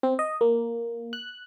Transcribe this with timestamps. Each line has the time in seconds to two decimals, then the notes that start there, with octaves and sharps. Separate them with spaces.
0.03 C4
0.19 D#5
0.41 A#3
1.13 F#6